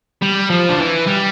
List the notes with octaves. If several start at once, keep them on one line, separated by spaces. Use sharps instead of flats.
G3
F3
D3
E3
G3